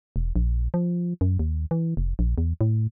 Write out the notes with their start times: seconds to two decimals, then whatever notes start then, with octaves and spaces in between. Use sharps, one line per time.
0.16 E1
0.36 A#1
0.74 F3
1.21 F#2
1.39 D#2
1.71 E3
1.97 F1
2.19 A#1
2.38 E2
2.61 A2